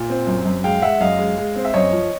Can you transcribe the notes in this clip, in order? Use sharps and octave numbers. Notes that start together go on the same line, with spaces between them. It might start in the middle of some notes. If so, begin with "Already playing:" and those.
Already playing: A#2
C4
F#2
F#2
G#3 F5 G5
G#3 E5 F#5
F#2 D#5 F5
G#3
G#3
C4
E5
F#2 C#5 D#5
F3